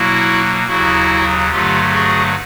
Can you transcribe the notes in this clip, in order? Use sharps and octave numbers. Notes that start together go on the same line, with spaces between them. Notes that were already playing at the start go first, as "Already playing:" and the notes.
Already playing: B2 F#3 A#3 E4 F#4
D#2 C#3 F#3 E4 F#4
G2 D3 F#3 A3 F4 G4
F#4 G#4